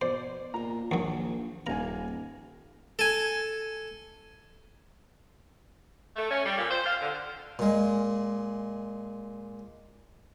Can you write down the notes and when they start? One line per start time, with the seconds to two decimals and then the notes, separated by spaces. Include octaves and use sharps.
0.01 B2 C5 D5
0.54 A#2 A#5
0.91 A#1 D#2 F#3
1.67 D#1 A#3 G#5 A#5
2.99 A4 G#5
6.16 A3
6.30 C#4
6.45 G3
6.58 A#2
6.70 C5
6.85 F5
7.01 D3
7.59 A#2 G#3